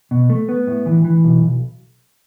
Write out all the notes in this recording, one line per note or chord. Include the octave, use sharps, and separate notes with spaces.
B2
A3
B3
A2
E3
E3
B1
B1